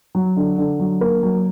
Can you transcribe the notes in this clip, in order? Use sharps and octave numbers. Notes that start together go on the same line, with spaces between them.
F#3
D3
D3
F#3
A#3
F#3